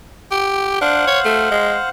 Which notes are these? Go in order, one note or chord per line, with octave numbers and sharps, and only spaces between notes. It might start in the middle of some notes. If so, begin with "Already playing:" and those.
G4
D4 C5 F5 F#5
C#5
A3
G#3